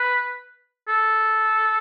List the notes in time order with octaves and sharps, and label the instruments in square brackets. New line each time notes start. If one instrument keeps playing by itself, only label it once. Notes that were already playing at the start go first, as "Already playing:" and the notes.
Already playing: [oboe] B4
A4